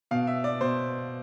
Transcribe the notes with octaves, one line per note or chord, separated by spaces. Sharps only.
B2 F5
E5
D5
B2 C5